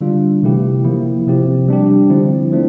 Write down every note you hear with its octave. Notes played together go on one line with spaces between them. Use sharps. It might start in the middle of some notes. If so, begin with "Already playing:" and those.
D3 G3 D4 F4
C3 E3 A3 E4 G4
F3 A#3 E4
C3 F3 C4 G4
G3 D4 G4
D3 F3 C4 E4
F3 A3 D4